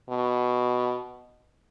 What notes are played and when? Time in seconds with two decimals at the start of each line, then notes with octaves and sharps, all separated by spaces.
0.10 B2